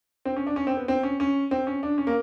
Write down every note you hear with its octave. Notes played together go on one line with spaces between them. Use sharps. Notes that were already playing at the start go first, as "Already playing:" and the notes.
C4
C#4
D4
C#4
C4
B3
C4
C#4
C#4
C4
C#4
D4
C#4
A#3